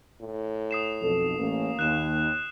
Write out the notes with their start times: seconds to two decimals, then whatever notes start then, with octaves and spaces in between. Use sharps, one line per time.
0.21 A2
0.71 D#6 C7 E7
1.02 B1 F2 A4
1.39 A1 A3 A#3 C#4
1.79 D#2 F#6 E7